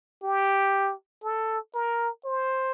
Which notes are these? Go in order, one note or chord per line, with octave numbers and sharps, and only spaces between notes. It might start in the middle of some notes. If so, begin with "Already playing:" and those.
G4
A4
A#4
C5